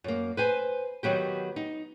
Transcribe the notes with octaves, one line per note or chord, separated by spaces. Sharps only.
F#2 A#3
B4 C5 G#5
D#3 F#3 B3 G4
D#4